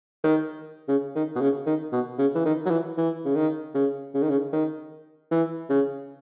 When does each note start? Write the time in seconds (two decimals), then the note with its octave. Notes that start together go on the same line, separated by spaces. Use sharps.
0.24 D#3
0.88 C#3
1.15 D#3
1.35 B2
1.41 C#3
1.66 D#3
1.92 B2
2.18 C#3
2.35 E3
2.45 D#3
2.66 F#3
2.70 E3
2.97 E3
3.25 C#3
3.35 D#3
3.75 C#3
4.14 C#3
4.22 D#3
4.29 C#3
4.53 D#3
5.31 E3
5.69 C#3